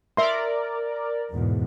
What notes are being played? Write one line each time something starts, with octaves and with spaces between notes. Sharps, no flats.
A#4 D5 E5 C6
E2 G#2 B2